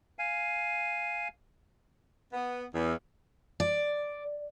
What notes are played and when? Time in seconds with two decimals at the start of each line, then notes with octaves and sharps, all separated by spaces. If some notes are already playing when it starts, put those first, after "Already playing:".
0.19 F5 G#5
2.33 B3
2.74 E2
3.60 D5